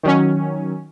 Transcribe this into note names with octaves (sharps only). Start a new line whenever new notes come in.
D#3 F#3 C#4